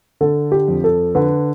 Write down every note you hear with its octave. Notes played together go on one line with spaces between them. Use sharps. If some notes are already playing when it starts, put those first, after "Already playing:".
D3 A4
G4
F2
A4
D3 B4